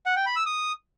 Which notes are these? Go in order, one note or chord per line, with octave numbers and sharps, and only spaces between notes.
F#5
G5
B5
E6
D#6